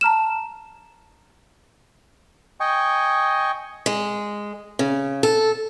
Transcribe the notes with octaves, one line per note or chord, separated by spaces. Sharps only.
A5 A#5 F6 E7
D#5 G5 G#5 C#6
G#3
C#3
A4